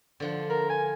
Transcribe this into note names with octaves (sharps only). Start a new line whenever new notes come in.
D3 F3 F#5
A#4 B5
G#5